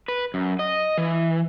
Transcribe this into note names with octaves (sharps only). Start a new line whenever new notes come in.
B4
F#2
D#5
E3